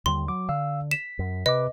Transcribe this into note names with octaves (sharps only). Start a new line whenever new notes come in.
D#2 D3 G3 C6
F#3 D6
D3 F5 E6
B6 E7
F#2
C3 B4 D#5 D6